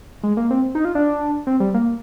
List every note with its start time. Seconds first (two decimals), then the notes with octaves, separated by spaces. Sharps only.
0.23 G#3
0.37 A#3
0.50 C4
0.75 D#4
0.85 F4
0.95 D4
1.47 C4
1.60 G3
1.74 A#3